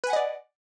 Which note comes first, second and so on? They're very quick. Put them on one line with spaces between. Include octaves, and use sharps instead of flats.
B4 G#5 F#5 D#5 D5